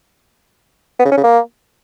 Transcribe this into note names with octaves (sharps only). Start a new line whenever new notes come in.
B3
C#3
C#4
C#3
A#3